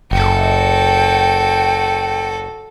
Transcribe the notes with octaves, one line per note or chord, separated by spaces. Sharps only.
F#1 F#4 A4 G5